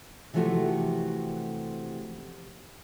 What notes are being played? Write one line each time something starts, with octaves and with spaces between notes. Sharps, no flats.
C3 E3 F3 A3 F#4 G4